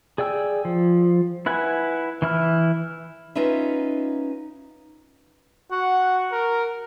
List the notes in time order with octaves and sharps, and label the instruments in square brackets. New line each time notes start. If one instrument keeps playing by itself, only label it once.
[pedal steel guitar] G#4 D5 G5 E6
F3
E4 B4 F#5 G#5
E3 E4 F6
[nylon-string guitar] C#4 D#4 F4 B4 C#5 E5
[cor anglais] F#4 [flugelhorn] F#5
[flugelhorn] A#4